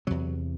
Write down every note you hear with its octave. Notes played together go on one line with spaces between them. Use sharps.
E2 C3 F#3